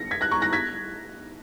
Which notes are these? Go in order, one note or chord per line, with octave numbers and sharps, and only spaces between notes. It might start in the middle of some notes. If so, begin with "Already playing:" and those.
Already playing: A#6 C#7
G#6 B6
F#6 A#6
A#5 C#6
F#6 A#6
G#6 B6